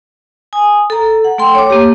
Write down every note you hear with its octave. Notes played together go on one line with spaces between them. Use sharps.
G#5 D#6
A4 A#5
F#5
A3 A4 G5 C6
C#5 D6
A#3 G4